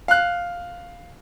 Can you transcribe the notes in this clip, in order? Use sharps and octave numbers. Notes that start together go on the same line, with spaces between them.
F5 F#6